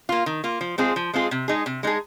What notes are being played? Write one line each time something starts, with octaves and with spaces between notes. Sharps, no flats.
A#3 F4
D#3
A#3 F4
F3
G#3 C4 F4 G#4
F3
G#3 C4 F4 G#4
C3
G#3 D#4 G#4
C3
G#3 D#4 G#4